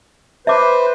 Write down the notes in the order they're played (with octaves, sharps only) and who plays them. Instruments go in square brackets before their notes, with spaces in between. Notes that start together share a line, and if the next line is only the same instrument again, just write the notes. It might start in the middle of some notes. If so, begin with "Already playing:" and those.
[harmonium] B4 C5 [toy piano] E5 D6